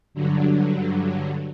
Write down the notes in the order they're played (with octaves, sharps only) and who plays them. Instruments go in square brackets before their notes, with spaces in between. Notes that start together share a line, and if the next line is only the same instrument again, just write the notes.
[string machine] G2 D3 F#3